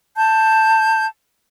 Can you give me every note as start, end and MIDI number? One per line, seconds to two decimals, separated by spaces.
0.16 1.06 81
0.16 1.06 91